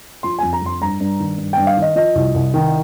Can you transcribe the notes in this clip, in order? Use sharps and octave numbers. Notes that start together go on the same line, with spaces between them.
F3 C6
F2 G#5
A#5
F2 C6
G2 A#5
G2
D#3
G2
G2 G5
F5
D#3 D#5
F3 D#5
C2
C2
D#3